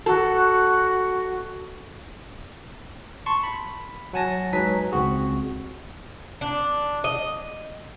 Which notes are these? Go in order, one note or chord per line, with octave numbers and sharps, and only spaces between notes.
F#4 A4
A5 C6 C#6
B5
F#3 F#5 G#5 A5 A#6
F#3 G#3 D#4 B4 G#5 B6
C#2 C4 F#4 G#4
D4
D#5